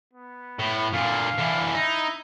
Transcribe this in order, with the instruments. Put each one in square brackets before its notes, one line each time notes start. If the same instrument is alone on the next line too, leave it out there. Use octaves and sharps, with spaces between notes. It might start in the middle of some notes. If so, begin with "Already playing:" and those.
[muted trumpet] B3
[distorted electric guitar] A2
[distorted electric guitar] A#2 D3 [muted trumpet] F5
[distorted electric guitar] D3 E3
[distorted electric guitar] D#4 [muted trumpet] E4